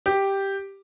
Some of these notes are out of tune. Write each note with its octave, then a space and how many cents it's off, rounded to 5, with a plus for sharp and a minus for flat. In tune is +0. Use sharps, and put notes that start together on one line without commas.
G4 +0